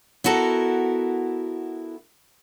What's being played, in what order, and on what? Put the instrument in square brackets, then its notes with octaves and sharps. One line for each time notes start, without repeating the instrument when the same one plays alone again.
[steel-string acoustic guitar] B3 E4 F#4 A4 A#4